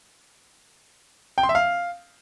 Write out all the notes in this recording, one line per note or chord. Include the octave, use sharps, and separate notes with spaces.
G5
C6
E5
F5